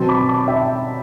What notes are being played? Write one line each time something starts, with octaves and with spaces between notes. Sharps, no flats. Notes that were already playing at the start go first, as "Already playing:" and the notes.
Already playing: B2 F#3 C4 A5 C6
B5 D6
B5 D6
E5 G5